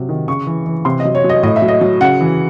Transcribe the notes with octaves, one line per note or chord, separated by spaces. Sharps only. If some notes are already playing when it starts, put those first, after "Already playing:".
Already playing: C3 F#3
D#3
C#3 C#6
E3
E3
C3 C6
D#5
F#3
C#5
F#3
D#5
A2 D#5
E5
F#3
D#5
F#3
C#3 F#5
E3